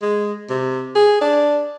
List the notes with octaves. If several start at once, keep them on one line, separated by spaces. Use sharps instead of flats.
G#3
C3
G#4
D4